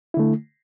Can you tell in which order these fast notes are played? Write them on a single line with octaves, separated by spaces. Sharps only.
E4 D3 A3